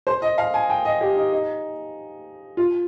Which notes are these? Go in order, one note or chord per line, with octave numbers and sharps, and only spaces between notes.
C5
D#5
F5
G#5
G5
D#5
G4
D#4
D#4
F4